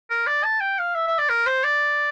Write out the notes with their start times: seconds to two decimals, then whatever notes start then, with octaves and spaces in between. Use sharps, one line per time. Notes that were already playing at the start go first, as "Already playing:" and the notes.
0.10 A#4
0.27 D5
0.44 A5
0.61 G5
0.79 F5
0.95 E5
1.07 E5
1.18 D5
1.29 A#4
1.46 C5
1.64 D5